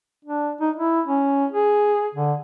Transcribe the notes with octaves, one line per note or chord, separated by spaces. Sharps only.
D4
D#4
E4
C#4
G#4
D3